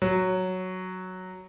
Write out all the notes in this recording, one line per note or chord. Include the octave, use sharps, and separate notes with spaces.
F#3